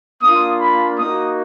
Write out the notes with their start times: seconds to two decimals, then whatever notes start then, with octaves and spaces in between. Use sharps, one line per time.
0.21 A#3 D4 F4 D#6
0.60 B5
0.98 A#3 D#4 F#4 D#6